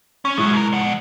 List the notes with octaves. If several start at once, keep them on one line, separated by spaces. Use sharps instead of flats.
C#4 C#6
A2 F#3 G#3 E4
B2 A#4
F3 F#5